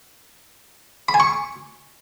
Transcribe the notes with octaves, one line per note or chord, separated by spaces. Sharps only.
B5
G#5
C#6